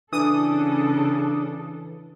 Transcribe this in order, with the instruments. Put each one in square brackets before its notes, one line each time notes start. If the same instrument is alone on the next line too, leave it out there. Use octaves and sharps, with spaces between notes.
[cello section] C#3 A4 [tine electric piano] E3 [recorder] D4 [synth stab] D#6